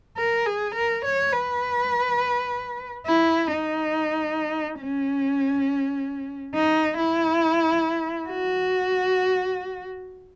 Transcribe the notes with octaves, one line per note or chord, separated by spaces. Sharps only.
A#4
G#4
A#4
C#5
B4
E4
D#4
C#4
D#4
E4
F#4